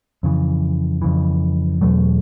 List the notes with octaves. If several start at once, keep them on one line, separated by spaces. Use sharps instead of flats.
F2 C#3 E3
F2 C#3 E3
E2 B2 F#3 A3